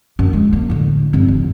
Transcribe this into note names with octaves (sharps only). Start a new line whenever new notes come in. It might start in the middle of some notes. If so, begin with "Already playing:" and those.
F#2 A#3
G#3
F#3 A#3
A2 D3
G2 C4
F1